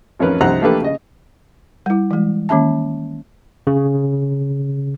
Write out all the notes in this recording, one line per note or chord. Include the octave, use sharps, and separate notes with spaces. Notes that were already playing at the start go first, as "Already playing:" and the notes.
A1 F2 C#4 D#4 A#4 B4
C2 C4 D#4 F#5 A#5 F#6
A3 A#3 D4 G4 A4 B4
C#3 D#5
G3 E4
E3 G#3
D#3 A#3 C#4 E5 A5
C#3